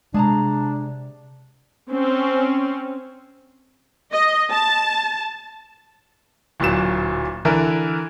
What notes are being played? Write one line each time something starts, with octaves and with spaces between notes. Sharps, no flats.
C3 G#3 D4 G#4 A5 A#5
C4 C#4
D#5
A5
D1 A#2 F#3 E7
D3 E3 E4 A#4